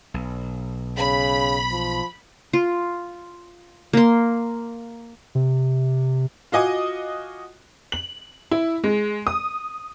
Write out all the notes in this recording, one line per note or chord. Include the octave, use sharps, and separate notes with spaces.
B1
C#3 B5
F3
F4
A#3 C6
C3
F4 F#4 D#5 G#5 D6
F#7
E4
G#3
D#6